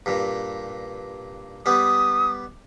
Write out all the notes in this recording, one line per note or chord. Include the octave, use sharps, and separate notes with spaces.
G2 A#2
G3 B3 D#6